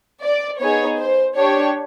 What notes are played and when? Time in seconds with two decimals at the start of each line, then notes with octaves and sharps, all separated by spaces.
0.23 D5
0.60 B3 D#4 G#4 C#5
0.98 C5
1.36 D4 G4 C#5